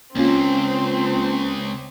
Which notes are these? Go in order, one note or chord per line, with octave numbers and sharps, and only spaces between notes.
C#2 A#3 C4 C#4 F4